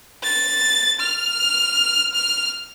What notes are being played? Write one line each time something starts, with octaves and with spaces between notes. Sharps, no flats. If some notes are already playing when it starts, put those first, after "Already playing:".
A6
F6
F6